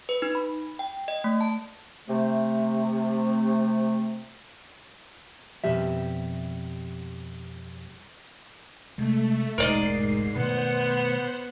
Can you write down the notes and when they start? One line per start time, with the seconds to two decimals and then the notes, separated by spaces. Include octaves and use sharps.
0.09 B4
0.22 D#4
0.35 B5
0.79 G5
1.08 D#5
1.24 A3
1.41 A5
2.09 C3 A3
5.64 F2 B2 G3 G4 E5
8.98 C3 G#3 A3
9.58 E1 A1 G#2 G3 A#4 D5 D#5 C7
10.36 B2 D#3 A3 B3 C5 F#5